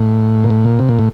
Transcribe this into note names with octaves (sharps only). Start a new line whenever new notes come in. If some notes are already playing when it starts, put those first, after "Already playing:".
Already playing: A2
A#2
A2
A#2
C3
A#2
A2